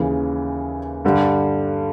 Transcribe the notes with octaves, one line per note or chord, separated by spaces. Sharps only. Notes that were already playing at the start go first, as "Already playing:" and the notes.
Already playing: D#2 C#3 E3
G2 D3 G3